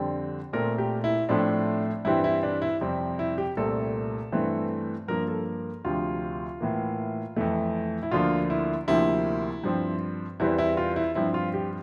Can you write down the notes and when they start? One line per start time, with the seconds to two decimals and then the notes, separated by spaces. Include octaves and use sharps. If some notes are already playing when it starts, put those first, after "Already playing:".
Already playing: F2 D3 G3 C4
0.53 A#2 A3 C4 A#4
0.78 G4
1.04 E4
1.29 A2 F3 A3 C4 D4
2.05 G2 E3 G3 C4 E4
2.24 E4
2.43 D4
2.62 E4
2.81 F2 C3 G3 C4
3.19 E4
3.38 G4
3.57 C2 A#2 A3 C4 A4
4.32 G2 E3 A3 C4
5.08 G2 F3 A#3 A#4
5.28 A4
5.85 D2 C3 F3 F4
6.60 A2 E3 A#3
7.36 F2 E3 A3
8.03 E4
8.11 D2 D3 F3 A#3 F4
8.50 E4
8.88 D2 C3 F3 A#3 E4
9.64 G2 F3 C4
10.40 E2 E3 G3 C4 E4
10.58 E4
10.77 F4
10.96 E4
11.15 G2 F3 C4 E4
11.34 F4
11.54 G4